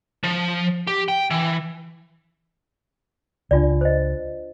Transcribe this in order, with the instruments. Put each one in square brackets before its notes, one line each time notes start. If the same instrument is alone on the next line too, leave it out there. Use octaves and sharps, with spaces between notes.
[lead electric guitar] F3
G4
G5
E3
[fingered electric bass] C#2 [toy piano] D4 F4 D5
[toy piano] C5 D#5